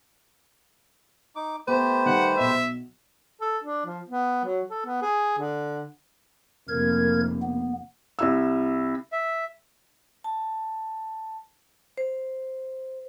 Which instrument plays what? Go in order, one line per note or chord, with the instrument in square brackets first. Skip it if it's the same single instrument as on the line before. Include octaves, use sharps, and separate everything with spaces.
[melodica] D#4 D6
[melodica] A3 G4 B4 [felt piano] B3 [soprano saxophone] C5
[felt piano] D#3 G3 [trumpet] F#5
[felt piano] B1 D#5 [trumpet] E5
[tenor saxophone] A4
D4
F3
B3
F#3
A4
B3
G#4
D3
[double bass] F1 A#3 [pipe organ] A#4 G#6
[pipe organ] B3
[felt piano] C2 E4 E6
[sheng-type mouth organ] E5
[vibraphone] A5
C5